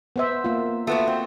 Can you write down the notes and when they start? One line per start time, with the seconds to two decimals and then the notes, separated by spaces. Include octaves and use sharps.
0.16 B3 C5 E5
0.44 A#3 F4
0.87 A3 B3 F4 F#4
1.08 C4